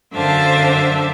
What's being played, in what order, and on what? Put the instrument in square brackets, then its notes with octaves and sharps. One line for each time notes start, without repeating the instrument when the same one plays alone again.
[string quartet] F#2 D3 C5 E5 F5 A5